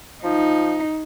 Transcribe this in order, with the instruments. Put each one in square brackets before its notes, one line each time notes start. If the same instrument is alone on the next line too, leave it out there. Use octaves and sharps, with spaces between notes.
[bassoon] F3 [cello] D#4